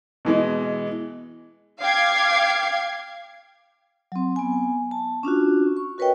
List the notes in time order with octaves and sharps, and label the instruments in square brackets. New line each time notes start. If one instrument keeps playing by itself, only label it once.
[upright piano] B2 E3 G#3
[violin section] F5 G5 D6 G#6 C7
[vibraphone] F#3 C4
B3 G#5
A5
C#4 D4 F4 F#4
C#6
F#4 A#4 B4 C#5 D#5 G5